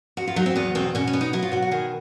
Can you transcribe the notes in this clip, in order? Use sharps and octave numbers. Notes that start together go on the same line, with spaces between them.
E2 F#4
F4
F#3 D#4
C4
E2 B3
B2 C4
B2 C#4
C#4
B3
D#4
F#3 E4
F4
B2 F#4
F#4
D#3 G#4